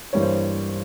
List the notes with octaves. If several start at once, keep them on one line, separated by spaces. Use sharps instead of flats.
G2 E3 G3 A#3 C#5
C5